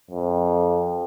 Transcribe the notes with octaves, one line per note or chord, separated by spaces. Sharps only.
F2